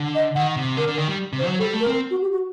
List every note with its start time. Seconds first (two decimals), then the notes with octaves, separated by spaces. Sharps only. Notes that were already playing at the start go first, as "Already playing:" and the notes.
Already playing: D3
0.15 D#5
0.35 D#3 F#5
0.57 C3
0.77 D3 A#4
0.88 D3
0.98 D#3
1.08 G3
1.33 C3
1.39 C5
1.45 F#3
1.59 G3 A4
1.73 A3
1.81 A#4
1.87 C4
2.11 F#4
2.22 G4
2.32 F#4